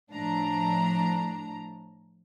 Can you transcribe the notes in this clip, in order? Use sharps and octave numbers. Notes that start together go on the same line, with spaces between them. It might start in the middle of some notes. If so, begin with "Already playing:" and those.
A2 F3 D4 A#5